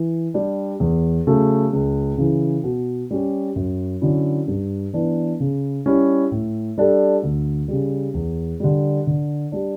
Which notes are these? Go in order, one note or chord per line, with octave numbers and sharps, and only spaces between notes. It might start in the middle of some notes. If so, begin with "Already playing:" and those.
Already playing: E3
G3 D4 G4
E2
C#3 F#3 A3
C#2
C#3 E3
B2
G3 C#4 G4
F#2
D3 F#3 C#4 E4
G2
E3 B3 D4
C#3
G3 C#4 E4
A2
G3 D4 A4
D2
C#3 G3
E2
D3 G3
D3
G3 D4